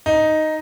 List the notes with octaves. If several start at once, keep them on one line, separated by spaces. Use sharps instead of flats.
D#4